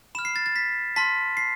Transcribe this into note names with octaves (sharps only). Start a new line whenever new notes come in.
B5 F6 E7
C7
A6
A6
B6
A5 C6 F6 B6
C7